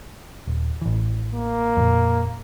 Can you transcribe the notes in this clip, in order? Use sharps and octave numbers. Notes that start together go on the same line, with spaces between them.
D#1
A1 E3
A#3
F2 A#2